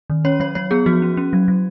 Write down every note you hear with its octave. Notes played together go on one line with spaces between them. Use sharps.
D#3
C#4 C#5
F#3 C#5
F#3 C#5
B3 G#4
F3 F#4
C#4
C#4
F#3
F#3